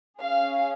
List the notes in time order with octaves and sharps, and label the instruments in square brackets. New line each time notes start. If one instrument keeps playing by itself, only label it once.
[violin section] C#4 G#4 F5